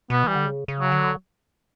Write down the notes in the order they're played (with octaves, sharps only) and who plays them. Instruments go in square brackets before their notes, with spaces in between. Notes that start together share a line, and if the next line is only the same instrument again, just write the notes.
[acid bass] B2 [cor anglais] B3
[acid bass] E3 [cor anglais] G3
[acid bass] D3
C#3
C#3
[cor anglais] F#3
[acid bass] D3